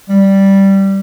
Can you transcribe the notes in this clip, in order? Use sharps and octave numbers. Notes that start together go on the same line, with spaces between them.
G3